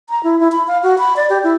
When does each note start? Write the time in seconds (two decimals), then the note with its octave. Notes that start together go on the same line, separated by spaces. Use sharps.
0.10 A#5
0.24 E4
0.40 E4
0.52 B5
0.68 F5
0.83 F#4
0.98 B5
1.16 D5
1.30 G4
1.44 E4